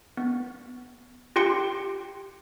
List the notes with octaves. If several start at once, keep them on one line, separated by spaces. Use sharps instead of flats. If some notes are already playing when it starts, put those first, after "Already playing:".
B3
F4 G4 G5 C6 C#7